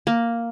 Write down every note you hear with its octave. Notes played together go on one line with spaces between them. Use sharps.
A#3